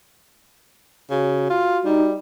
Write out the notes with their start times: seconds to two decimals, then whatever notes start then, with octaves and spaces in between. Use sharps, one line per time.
1.11 C#3 F#4
1.50 F4
1.85 G3 D#4